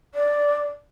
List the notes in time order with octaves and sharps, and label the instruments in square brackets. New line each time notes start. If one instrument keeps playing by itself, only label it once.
[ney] D5